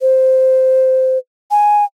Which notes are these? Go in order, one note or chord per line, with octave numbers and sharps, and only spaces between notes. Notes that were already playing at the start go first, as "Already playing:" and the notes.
C5
G#5